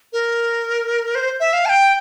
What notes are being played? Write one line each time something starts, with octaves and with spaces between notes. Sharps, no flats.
A#4
C5
E5
F5
A5
G5